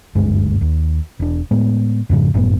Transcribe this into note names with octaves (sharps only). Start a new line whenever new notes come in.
F#1 D2 G2 G#3
D#2
E1 D4
A2 G#3 B3
F2 G#2 C#3 F3
G1 F#2 A2 B3